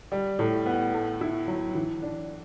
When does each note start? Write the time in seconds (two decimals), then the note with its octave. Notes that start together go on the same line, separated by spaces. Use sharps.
0.12 G3
0.39 A2
0.66 B3
0.94 A3
1.21 E4
1.47 F#3
1.75 E3
2.02 D4